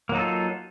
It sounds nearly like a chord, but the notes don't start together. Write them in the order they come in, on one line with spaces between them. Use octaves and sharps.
A#3 F#3 D#4 A4 F4